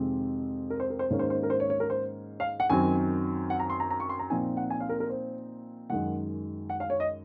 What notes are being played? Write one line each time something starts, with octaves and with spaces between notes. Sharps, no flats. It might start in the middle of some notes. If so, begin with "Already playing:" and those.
Already playing: F2 C3 D#3 G#3 C4
A#4
C5
A#4
C5
G#2 D#3 A#3 C#4 C#5
C5
C5
A#4
C5
C#5
C#5
A#4
C5
F5
F#5
F#2 D#3 F#3 C4 G#5
F#5
A#5
C6
A#5
A#5
C#6
C6
A#5
A#2 F3 C4 D#4 G#5
F#5
G#5
F5
A#4
A#4
C5
F#2 D#3 G#3 F#5
F#5
F5
C#5
D#5